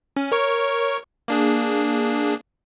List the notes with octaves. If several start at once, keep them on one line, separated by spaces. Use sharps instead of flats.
C#4
A#4 C#5 C#6
A#3 D4 G#4